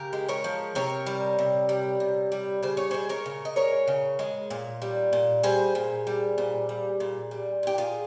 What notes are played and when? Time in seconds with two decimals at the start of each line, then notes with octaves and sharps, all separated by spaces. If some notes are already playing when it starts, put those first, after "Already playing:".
Already playing: C#3 G4 A#4
0.13 G#3
0.29 A#4 C#5
0.44 F3
0.75 C3 A#4 C#5
1.06 G3
1.39 C3
1.69 G3
2.00 C3
2.32 G3
2.63 C#3 C5
2.77 C#5
2.91 G#3 G#4 C5
3.09 A#4 C#5
3.26 C#3
3.45 D#5
3.56 G#3 A#4 C#5
3.88 C#3
4.19 G#3
4.50 A#2
4.82 G3
5.13 A#2
5.43 G3 G#4 C5
5.75 A#2
6.07 G3
6.38 A#2
6.69 G3
7.00 A#2
7.31 G3
7.63 A#2 G4
7.78 F4 G#4